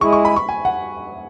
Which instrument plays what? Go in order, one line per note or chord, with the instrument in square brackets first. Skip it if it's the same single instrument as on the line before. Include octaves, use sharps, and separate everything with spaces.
[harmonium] G#3 E4 G#4 [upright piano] C#6
[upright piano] C#6
B5
C#6
G#5
F#5